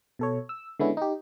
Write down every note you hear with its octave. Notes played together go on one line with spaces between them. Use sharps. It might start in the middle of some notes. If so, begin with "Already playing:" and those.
B2 A4 C#5
E6
D3 G#3 B3 C#4 E4
D#4 G4